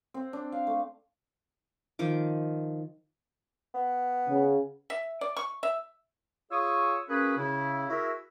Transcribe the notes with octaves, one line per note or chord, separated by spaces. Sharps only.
C4
D4
F5
A3
D#3 F3 D6
B3
C#3
E5
D5
C#6
E5
F4 G#4 C#5 C#6 D#6 E6
A#3 C#4 F#4 G#4 B4
C#3 E4
E4 F#4 G#4 A#4 E5